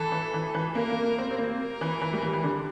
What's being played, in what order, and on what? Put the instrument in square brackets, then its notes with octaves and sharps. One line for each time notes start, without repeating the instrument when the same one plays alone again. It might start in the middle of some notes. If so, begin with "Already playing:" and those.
Already playing: [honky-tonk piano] E3 [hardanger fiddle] A4
[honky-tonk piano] E3
E3
E3
[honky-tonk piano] A#3 [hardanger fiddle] A#4
[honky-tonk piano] A#3
A#3
C4
C4
A#3
[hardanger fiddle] A#4
[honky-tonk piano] E3
E3
G3
E3
E3
D3